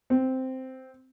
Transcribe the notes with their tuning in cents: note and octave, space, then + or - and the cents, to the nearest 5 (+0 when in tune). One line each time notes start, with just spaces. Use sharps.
C4 -5